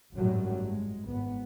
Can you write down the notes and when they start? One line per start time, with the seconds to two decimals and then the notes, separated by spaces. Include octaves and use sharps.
0.15 G#1 F#2 A2 F#3 G3
0.66 G#3
1.07 G#1 B3